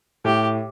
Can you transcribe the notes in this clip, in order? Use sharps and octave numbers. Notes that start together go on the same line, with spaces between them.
A2 G4